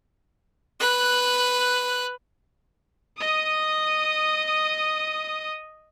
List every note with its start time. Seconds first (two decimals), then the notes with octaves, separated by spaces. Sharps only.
0.80 B4 F#6
3.17 D#5 D#6